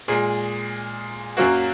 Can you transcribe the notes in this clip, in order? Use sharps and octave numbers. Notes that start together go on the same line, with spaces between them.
A#2 G#3 G#4
F#2 F#3 A#3 F#4